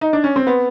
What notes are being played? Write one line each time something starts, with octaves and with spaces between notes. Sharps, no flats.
D#4
D4
C#4
C4
B3